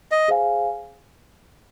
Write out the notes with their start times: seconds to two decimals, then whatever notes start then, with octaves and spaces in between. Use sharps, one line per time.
0.12 D#5
0.28 G#4 C5 F5 G#5